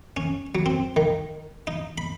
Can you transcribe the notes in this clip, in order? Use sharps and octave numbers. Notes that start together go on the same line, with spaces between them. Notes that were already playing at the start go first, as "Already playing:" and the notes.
C#4
F#3
C4
D#3
D#4
B5